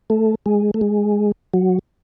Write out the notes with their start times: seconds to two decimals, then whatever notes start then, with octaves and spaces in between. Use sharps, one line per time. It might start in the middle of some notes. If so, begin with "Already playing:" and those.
0.10 A3
0.46 G#3
0.74 A3
0.81 G#3
1.54 F#3